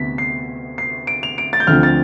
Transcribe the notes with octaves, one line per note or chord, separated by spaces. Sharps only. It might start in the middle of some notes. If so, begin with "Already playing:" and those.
Already playing: D2 C3 B3 B6
C7
C7
D7
F7
D7
A6
G6
D2 D3 F3 C4 F6
A6